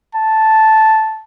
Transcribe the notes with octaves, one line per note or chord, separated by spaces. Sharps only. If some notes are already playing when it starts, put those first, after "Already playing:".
A5